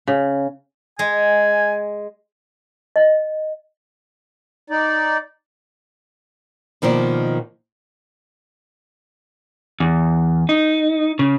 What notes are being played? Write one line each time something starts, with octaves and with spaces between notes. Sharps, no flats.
C#3
G#3 G#5
D#5
D#4 D5
B2 D#3 F3 A#3 D5
E2
D#4
C#3